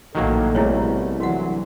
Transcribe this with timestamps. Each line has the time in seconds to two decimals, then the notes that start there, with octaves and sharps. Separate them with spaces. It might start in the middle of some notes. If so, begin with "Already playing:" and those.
0.15 A#1 A2 D#3 F#3 A#3 A4
0.55 C2 B2 A3 E4 G#4 C#5
1.20 D3 E3 F#3 F#4 F#5